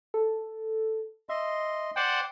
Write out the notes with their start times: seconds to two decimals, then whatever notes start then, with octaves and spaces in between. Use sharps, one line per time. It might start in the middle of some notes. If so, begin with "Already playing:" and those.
0.14 A4
1.29 D#5 E5 C6
1.96 C5 D5 F#5 G5